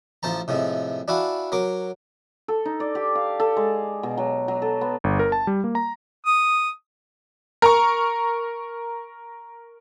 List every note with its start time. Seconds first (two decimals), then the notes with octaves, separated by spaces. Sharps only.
0.23 A1 F3 C5 A5 A#5
0.48 A2 C3 F3 G#3
1.08 D4 E4 F#4 F5 G#5
1.52 F#3 A#4 D6
2.48 A4
2.65 D#4
2.80 D5
2.95 G4
3.15 F5
3.40 A4
3.57 G#3
4.03 B2
4.17 F#3
4.48 F#3
4.62 A4
4.81 B3
5.04 G1
5.19 A#4
5.32 A5
5.47 G3
5.64 A#3
5.75 A#5
6.26 D#6
7.62 A#4 A#5 C#6